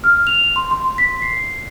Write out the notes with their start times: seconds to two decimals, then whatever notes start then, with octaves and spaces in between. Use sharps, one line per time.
0.04 F6
0.27 F7
0.56 C6
0.71 C6
0.98 B6
1.22 C7